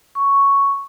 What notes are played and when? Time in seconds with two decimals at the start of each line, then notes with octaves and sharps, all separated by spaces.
0.15 C#6